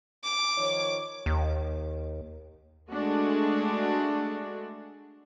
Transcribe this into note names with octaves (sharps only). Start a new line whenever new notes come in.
D6
D#3 F3 C#5
D#2
G#3 A3 D4 F#4